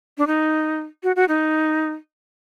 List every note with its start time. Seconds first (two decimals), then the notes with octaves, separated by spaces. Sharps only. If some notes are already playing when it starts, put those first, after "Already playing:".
0.18 D4
0.27 D#4
1.03 F#4
1.16 F#4
1.28 D#4